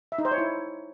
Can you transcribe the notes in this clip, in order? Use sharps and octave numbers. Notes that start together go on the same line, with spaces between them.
E5
D#4
C5
C#5
E4